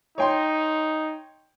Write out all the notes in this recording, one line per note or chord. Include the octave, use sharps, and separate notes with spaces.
D#4 C#5 G5 C6